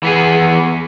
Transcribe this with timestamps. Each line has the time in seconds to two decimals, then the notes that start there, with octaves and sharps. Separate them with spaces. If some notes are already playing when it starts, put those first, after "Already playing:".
0.03 E3 B3 G#4